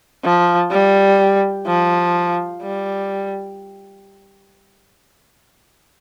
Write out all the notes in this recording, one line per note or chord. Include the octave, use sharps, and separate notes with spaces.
F3
G3
F3
G3